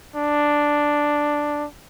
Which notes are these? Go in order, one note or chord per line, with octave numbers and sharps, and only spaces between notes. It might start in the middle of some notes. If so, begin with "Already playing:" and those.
D4